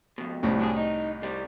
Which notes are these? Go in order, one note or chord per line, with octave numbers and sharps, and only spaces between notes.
F2 B2
C2 A2
F#3 D4 G#4
D#4
C3 G3